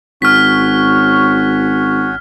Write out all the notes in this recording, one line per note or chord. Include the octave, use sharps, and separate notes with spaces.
G#1 C#4 F#4 C#5 F6 B6